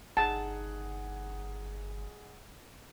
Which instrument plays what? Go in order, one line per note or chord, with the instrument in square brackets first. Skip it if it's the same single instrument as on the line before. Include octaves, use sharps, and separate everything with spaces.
[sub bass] G1 [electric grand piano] D#4 G#4 F#5 [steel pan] A5